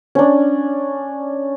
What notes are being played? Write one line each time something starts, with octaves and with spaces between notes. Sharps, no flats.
C#4 D4